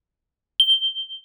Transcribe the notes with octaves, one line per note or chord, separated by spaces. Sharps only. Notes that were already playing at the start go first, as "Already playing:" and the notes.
G7